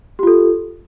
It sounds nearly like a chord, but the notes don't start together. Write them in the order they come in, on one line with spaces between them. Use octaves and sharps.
G4 F4 A4